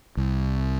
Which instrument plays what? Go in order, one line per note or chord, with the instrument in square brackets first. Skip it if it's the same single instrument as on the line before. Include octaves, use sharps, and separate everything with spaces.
[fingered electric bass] C2